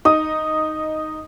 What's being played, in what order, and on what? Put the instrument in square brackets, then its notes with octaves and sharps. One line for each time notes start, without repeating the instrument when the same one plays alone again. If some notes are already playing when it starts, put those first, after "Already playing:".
[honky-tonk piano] D#4 [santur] D#6